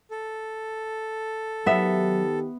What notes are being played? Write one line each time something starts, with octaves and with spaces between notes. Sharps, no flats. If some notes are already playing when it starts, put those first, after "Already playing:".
A4
D#3 F#3 B3 G4 E5